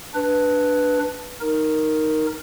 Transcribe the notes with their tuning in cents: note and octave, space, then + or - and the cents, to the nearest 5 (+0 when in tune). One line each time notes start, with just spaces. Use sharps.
D4 +0 B4 +0
D#4 +0 A#4 +0